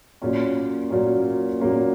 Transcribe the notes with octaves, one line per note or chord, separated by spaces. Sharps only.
A#2 F#3 A#3 C#4
A#2 F#3 A#3 C#4
A#2 F#3 A#3 C#4